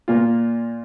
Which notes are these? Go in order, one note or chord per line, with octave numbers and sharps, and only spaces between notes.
A#2 A#3 F4